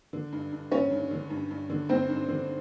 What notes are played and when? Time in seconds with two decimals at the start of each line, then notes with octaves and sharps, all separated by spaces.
0.13 D3
0.33 G2
0.52 G2
0.72 G2 C#4 C#5
0.91 G2
1.11 D3
1.30 G2
1.51 G2
1.69 D3
1.89 G2 C4 C5
2.09 G2
2.28 D3